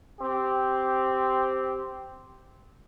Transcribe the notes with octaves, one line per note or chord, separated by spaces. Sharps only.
C4 G4